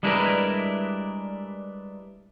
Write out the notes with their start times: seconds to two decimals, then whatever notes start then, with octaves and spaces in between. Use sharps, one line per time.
0.03 G3 G#3 D4 E4 A#4 B4